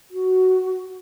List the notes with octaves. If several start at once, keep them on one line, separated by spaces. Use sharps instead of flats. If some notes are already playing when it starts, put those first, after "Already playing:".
F#4